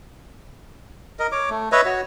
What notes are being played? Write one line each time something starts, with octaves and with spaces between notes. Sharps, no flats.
A#4 D#5
C#5 D6
A3
B4 C#5 D#5 E5
F#4 C#5